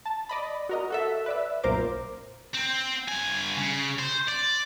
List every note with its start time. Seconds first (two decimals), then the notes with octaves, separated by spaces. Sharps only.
0.06 A5
0.29 D5 D#5 B5
0.69 F#4 A#4 D#5
0.90 F#4 A4 E5
1.26 B4 D5 E5
1.63 B1 F#2 A#2 A#4 C5 D6
2.54 C4
3.08 G2 G#5
3.57 C#3
3.99 C5
4.28 D5